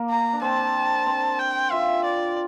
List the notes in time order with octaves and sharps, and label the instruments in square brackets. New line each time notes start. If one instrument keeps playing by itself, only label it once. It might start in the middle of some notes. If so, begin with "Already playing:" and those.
Already playing: [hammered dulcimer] A#3
[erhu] A#5
[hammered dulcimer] D4
[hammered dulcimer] C4 [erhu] A5
[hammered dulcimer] C4
[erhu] G5
[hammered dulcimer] F4 [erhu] E5
[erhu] D5